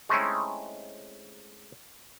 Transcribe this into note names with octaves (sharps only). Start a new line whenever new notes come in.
G#3 A3 C4 C#4 D#4 E4